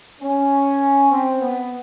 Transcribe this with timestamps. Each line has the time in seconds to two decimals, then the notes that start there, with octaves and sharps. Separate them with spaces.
0.21 C#4
1.12 C4
1.42 B3